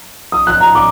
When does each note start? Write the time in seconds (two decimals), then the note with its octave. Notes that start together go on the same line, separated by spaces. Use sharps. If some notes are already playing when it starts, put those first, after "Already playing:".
0.32 D#6
0.47 F#6
0.61 A#5
0.75 D6